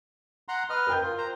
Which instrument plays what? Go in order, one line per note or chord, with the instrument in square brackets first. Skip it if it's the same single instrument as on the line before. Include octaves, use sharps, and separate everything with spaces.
[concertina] F#5 A#5 C6
B4 D#5 F6
[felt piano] A#4 G5 G6
[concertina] F4
C5 A#5